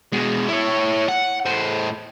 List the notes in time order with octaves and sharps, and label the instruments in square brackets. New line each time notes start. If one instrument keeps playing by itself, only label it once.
[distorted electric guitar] B2 G#3
E4 C#5
F#5
A2 C5